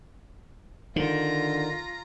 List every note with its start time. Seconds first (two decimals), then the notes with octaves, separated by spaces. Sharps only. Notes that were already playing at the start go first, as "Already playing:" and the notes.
0.96 D3 D#3 F4 A#5